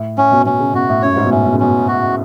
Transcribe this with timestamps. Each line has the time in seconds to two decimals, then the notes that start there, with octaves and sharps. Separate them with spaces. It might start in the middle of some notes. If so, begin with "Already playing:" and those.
Already playing: A2
0.18 A2 C#4
0.32 B2
0.46 B2 C#4
0.60 C#3
0.74 B2 F#4
0.89 A2
1.02 F#2 C#5
1.13 A2
1.16 G#2
1.25 B2
1.31 A2 C#4
1.46 B2
1.53 C#3
1.60 B2 C#4
1.88 F#4